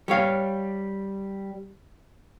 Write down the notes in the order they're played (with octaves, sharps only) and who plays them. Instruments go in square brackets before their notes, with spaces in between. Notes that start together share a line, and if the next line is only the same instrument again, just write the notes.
[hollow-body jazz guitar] G3 C#5 F5